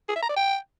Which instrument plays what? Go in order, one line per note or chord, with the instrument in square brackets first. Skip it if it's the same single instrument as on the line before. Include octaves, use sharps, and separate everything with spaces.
[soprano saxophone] G#4
E5
A#5
D5
G5